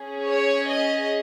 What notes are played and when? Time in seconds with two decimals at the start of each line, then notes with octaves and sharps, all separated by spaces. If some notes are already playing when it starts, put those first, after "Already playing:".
Already playing: C#4 G#4
0.28 C#5
0.68 D#5